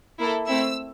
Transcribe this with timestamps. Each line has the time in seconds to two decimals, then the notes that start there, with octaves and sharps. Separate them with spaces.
0.19 A#3 E4 A4
0.48 A3 C4 E4 E6